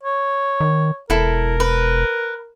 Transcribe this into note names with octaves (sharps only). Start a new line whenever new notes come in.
C#5
D#3
E1 E4 A4 A#4
B4